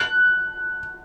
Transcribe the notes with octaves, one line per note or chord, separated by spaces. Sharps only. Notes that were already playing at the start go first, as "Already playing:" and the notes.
Already playing: F#6